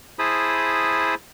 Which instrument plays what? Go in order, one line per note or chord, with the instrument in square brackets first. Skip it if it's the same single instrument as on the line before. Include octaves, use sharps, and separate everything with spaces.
[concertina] E4 G#4 C5 A5 B5 D#6